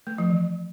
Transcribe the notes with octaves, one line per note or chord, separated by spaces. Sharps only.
A3
F3
E3